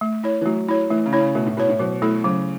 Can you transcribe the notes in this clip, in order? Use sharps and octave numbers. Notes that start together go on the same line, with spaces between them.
A3
E4 C#5
E3
F#3 A3
E4 C#5
E3 A3
C#3
E4 C#5
C#3
B2 A3
A2
B2 E4 C#5
A2
B2 F#3
A3 E4 A4
C#3 F#3